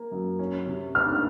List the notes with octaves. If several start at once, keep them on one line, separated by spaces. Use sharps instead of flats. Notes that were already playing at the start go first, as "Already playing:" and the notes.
Already playing: A#3
F#2
C#4
C3
D4 F6